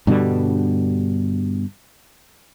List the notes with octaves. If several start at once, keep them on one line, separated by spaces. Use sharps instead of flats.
G2 B2 D3 G3